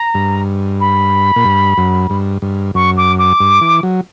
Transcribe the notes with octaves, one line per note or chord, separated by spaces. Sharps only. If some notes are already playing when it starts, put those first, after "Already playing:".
Already playing: A#5
G2
B5
A#2
G2
F#2
G2
G2
F#2 C#6
D6
D6
G2
E3
F#3